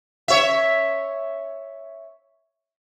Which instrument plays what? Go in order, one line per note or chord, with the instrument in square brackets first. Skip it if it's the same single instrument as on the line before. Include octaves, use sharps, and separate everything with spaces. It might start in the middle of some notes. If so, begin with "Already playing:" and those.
[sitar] C#5 E5